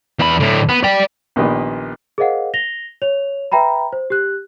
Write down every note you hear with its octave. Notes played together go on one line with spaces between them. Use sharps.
E2 B5
A2 D3
B3
D5 G5
A#1 A#2 D#3 B3 G4 B4
G#4 A#4 C5 D#5 F5 F#5
A#6 F7 G7
C#5 F7
B4 E5 G5 A#5 B5
C5
G4 F#6